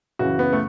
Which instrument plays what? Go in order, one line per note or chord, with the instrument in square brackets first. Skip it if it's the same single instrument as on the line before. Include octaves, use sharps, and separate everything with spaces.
[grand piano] F#2 C#3 E3 F#4
B3
A3